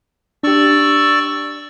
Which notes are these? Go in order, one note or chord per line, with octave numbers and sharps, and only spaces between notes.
D4 G4 D5 C#6 E6